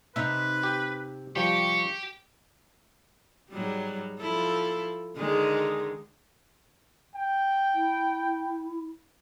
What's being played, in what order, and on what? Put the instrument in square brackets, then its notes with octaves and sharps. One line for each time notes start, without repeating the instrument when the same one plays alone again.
[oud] C3 D#4 [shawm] B4 [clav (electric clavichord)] E5
[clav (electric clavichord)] G4
[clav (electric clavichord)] F3 G3 [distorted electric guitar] G4 [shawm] C#6
[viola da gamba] G#2 F#3 G3
F3 E4 A4
D3 D#3 G#3
[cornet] G5
[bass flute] E4